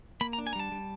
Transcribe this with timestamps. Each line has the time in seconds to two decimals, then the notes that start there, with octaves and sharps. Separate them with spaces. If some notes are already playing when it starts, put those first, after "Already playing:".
0.21 A#3 B5
0.33 A#5
0.38 D4
0.47 G#5
0.53 A#5
0.55 G3 A5
0.72 G3